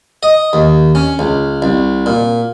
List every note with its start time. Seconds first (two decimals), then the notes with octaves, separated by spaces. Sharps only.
0.23 D#5
0.53 D#2
0.95 C#4
1.19 C#2
1.62 C2
2.06 A#2